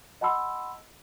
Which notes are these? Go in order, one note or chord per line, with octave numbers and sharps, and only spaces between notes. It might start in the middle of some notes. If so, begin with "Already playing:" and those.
D#5 F#5 A5 B5 C6 E6